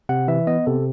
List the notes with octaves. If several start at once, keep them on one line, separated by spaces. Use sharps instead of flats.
C3 F#5
E3 E5
B3 D#5
C3 A4